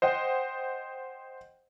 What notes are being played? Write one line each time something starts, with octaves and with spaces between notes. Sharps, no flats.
C5 D#5 F#5 G5